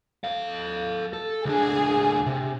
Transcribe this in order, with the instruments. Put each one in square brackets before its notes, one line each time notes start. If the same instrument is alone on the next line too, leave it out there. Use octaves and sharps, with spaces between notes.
[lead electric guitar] A4 F5
A4
[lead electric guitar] C#2 D4 [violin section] G#4
[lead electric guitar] C3